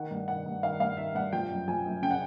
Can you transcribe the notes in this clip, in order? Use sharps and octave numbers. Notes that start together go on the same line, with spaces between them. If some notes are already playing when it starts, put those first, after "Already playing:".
Already playing: D#3 F#5
G2
D#3 F#5
G2
D#3 F5
G2 F5
D#3 E5
G2 F#5
F3 G5
F#2
F3 G#5
F#2
C#3 G5
F#5